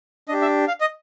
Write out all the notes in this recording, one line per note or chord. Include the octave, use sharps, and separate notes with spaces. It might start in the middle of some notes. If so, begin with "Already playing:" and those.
D4 G4 D#5
E5
F5
D#5